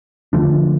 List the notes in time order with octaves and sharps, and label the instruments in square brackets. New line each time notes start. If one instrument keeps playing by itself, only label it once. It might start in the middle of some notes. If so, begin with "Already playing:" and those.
[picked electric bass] D3 F3 A3 D4